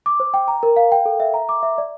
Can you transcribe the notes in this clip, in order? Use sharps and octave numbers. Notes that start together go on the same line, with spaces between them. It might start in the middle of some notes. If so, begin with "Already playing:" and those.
D6
C5
G5
A#5
A#4
F5
G5
A4
E5
A#5
D6
E5
D5